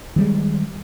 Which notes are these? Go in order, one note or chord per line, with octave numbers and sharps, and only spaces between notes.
D#3 G3 G#3